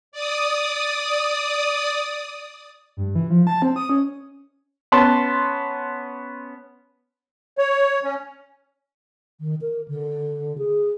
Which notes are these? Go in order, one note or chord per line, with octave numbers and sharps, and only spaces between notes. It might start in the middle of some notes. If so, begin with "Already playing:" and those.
D5 D#6
G2
E3
F3
A5
C4
D#6
C#4
B3 C#4 A5 C6
C#5
C#4
D#3
A#4
D3
G#4